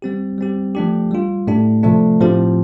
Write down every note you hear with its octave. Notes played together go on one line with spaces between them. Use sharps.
G3 C4 G4
G3 C4 G4
F3 A3 D4 G4
G3 F4
A2 A3 D4 G4
C3 F3 A3 D4
A2 F3 C4 G4